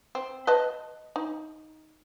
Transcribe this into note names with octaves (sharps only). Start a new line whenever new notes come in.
C4
B4 D#5 A5
D#4